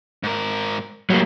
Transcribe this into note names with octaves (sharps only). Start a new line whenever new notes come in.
G#2 A#4
A2 F#3 G3 A#3